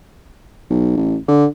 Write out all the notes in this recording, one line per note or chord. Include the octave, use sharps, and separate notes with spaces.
B1
A1
D3